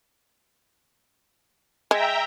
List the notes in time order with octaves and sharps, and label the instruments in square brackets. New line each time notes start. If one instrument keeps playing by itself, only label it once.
[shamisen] G#3 [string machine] E5 G5 A#5